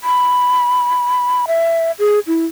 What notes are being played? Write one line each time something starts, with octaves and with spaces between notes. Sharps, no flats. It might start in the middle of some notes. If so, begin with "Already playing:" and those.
B5
E5
G#4
E4